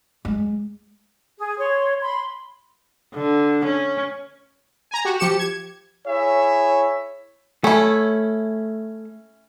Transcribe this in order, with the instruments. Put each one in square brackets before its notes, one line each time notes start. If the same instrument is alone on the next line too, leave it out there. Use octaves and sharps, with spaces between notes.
[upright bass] G#3
[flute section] G#4
C#5 C6
B5 C6
[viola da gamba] D3
C#4
[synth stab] G#5 A#5
F#4 G4
F3 G4 C#7 E7
G#6
[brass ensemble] E4 G#4 C#5 E5
[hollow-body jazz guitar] A3 [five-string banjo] C#4 E4